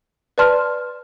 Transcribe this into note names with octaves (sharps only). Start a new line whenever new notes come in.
B4 D5 A5 C6 F6